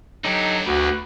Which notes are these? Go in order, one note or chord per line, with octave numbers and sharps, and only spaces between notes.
D3 F#3 D#4 G4 A4
D2 F#4 B4